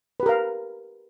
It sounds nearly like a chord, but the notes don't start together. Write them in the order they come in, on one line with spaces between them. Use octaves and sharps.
B4 G4 A#4 F5